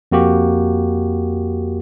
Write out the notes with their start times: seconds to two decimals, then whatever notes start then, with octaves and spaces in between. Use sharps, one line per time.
0.12 F2 A#3 F#4 G4